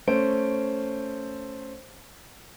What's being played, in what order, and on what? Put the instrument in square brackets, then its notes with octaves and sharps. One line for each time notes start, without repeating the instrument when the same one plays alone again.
[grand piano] A3 C#4 C5 D7